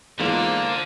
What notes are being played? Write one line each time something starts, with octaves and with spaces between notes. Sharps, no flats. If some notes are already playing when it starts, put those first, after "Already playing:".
E2 G#2 D3 F3 A#3 F4 C5 D5